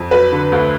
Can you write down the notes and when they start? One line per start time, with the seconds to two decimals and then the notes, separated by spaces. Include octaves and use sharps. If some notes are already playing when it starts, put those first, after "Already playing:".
Already playing: F2
0.11 F#3 B4
0.32 D3
0.52 D2